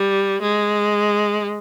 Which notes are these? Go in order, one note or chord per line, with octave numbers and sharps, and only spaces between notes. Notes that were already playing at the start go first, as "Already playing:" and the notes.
Already playing: G3
G#3